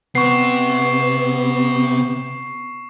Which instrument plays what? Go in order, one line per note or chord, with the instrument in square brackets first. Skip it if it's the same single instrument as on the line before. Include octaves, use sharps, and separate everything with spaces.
[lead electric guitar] C3 [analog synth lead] B3 [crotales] C#6 C7